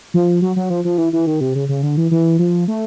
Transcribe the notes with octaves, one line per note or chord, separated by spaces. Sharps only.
F3
F#3
F#3
F3
F3
E3
E3
D#3
C3
C#3
C#3
D3
E3
E3
F3
A3